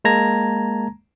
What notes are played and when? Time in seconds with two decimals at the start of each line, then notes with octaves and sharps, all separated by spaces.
0.05 G#3 A#3 A5 A#5 G#6 A#6